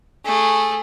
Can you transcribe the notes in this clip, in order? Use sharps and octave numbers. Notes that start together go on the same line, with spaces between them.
A3 G#4